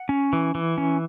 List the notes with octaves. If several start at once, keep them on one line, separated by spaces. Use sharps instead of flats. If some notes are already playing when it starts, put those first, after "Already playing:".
Already playing: F#5
C#4
E3
E3
C#4